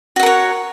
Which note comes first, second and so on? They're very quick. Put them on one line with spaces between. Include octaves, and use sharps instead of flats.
F#4 F#5 A#4 C#5